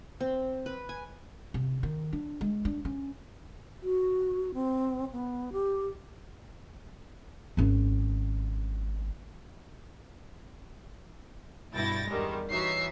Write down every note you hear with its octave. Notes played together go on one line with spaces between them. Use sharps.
C4
B4
G#5
C3
D#3
D4
G#3
D4
C#4
F#4
C4
B3
G4
G#1 C#4
G2 B2 E4 G5 A6 A#6
E2 G2 D#3 G3 G#3
E3 D#4 F#4 C#5 E5 C7